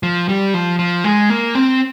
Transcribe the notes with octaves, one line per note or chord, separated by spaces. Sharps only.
F3
G3
F3
F3
G#3
A#3
C4